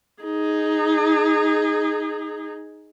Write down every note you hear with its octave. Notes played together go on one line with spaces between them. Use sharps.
D#4 G#4